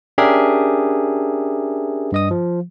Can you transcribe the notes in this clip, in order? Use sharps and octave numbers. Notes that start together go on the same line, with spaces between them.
C#4 D4 G4 G#4 A#4 E5
G2 D#5 D#6
F3